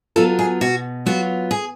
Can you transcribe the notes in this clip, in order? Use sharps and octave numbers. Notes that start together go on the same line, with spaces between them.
F#3 B3 F4 A4
G#4
B2 F#4
F#3 B3 F4 F#4
G#4